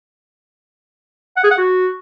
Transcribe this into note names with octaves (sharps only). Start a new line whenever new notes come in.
F#5
G#4
F#5
F#4